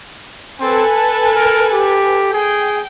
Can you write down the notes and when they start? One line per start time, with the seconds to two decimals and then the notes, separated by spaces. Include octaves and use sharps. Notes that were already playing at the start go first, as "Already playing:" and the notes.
0.61 C4 A4 B4 G#5
0.94 A5
1.35 A#4
1.72 G4
2.33 G#4 G5